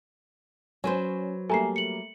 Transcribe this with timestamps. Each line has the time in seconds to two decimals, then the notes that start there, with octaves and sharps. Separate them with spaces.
0.84 F#3 C#4 B4 C5
1.50 G3 A3 A#3 G#5 A#5 C7
1.76 C#7 F#7